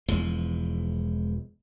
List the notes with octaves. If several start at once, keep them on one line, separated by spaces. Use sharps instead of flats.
E1 E2 F3 G#3